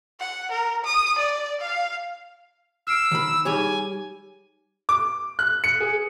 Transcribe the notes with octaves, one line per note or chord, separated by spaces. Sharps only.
F#5
A#4
D#6
D5
F5
E6 F6 C7 D7
D#3 B5
G3 D#4 G4 G#4 C#5 G#5
D6
F#6
C#7
G#4